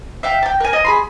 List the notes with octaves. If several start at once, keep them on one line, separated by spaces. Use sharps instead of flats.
E5 F5 G5
G5 A5
A#4 G#5
D#5
G#4 B5 C6